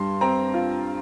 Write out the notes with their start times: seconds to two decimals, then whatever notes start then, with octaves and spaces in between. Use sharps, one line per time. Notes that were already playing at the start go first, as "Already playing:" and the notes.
Already playing: G2 G3 C6
0.21 C4 G5 A#5
0.54 F4